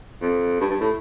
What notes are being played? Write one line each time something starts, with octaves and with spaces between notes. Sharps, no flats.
F2
G2
G2
A2